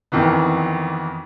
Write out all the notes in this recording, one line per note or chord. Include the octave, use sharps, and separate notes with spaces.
F2 D#3 E3 B3